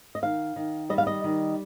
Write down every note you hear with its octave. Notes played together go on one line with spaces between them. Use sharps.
D#5
D#3 F5
D#3
G3 D#5
F5
D#5
D#3